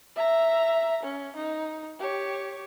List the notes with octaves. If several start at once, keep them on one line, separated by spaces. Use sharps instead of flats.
E5 A#5
C#4
D#4
G4 C#5